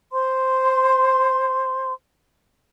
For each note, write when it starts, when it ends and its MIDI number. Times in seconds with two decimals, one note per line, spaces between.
0.12 1.92 72
0.12 1.92 84